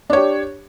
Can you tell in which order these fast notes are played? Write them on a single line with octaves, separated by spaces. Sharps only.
D4 C#5 G4